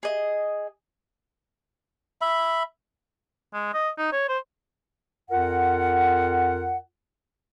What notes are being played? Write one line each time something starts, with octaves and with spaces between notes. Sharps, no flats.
G#4 D#5
E5 B5
G#3
D#5
D#4
C#5
C5
F2 F4 A#4 F#5